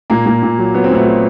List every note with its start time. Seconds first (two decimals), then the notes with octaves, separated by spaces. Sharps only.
0.10 A#2 A#3
0.26 A#2
0.43 A#2
0.58 F#3
0.74 F#3 B3
0.84 C4
0.90 A#2 A3 B3
1.07 F#3